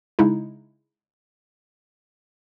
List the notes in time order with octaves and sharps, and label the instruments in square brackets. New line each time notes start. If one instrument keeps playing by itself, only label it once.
[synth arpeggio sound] C#3 G#3 D#4 E4